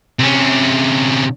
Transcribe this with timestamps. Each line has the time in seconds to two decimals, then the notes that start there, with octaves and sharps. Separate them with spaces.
0.19 C3 C#4